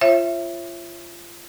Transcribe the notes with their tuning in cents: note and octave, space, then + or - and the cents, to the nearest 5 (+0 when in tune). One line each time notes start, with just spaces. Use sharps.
F4 -25 C#5 -35 E5 +15